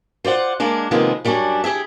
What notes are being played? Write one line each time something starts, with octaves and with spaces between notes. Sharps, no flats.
F4 C5 D5 F#5
G#3 A#3 D4
C3 D#3 F3 G#3 A#3 B3
F#2 G3 B3 C#4 D4
E4 G4 G#4 E5